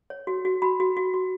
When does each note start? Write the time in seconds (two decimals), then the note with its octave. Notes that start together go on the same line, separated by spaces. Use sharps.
0.10 C#5
0.27 F#4
0.45 F#4
0.62 F#4 B5
0.80 F#4
0.97 F#4
1.14 F#4